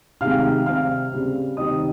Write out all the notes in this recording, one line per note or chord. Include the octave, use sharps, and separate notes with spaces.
C3 D#3 G#3 F5 F6
C3 G3 C4 F5 F6
C#3 G3 C4
C3 D#3 G3 C4 D#5 D#6